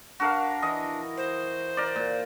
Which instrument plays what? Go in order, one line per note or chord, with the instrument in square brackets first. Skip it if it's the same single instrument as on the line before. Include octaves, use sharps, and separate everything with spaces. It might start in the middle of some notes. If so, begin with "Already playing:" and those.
[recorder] D4 [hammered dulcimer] F#4 A#4 F5
[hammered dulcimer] E3 D#5
[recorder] C5
[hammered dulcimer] A#4 D5
A#2